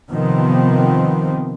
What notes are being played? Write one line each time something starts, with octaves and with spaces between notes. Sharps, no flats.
C3 D#3 F3 B3 C4